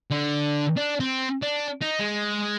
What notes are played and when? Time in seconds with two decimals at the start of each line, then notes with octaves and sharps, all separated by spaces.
0.11 D3
0.77 D4
1.00 C4
1.42 D4
1.81 D#4
1.99 G#3